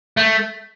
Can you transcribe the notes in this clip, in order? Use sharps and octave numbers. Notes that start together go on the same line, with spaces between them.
A3